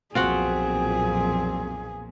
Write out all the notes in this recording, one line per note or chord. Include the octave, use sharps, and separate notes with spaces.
B1 F2 A#2 C4 F4 F#4 G#4 F#5